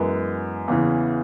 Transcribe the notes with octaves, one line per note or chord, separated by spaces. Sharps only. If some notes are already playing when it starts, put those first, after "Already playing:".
Already playing: F#2 E3 G#3 B3
E2 C#3 E3